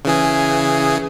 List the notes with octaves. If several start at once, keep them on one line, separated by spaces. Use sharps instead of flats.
C#3 E3 G#4